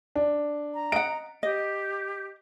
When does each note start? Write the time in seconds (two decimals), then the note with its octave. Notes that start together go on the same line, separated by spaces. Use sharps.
0.16 D4
0.74 A#5
0.92 D#5 F#5 D7
1.43 G4 D#5